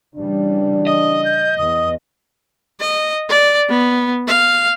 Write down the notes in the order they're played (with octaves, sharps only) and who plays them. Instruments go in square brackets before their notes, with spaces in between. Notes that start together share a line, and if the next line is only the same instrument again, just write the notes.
[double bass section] C#3 E3 G3 [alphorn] D4
[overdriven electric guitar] D#5 [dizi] D#6
[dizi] G6
[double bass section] E2 [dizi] D#6
[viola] D#5
D5
B3
F5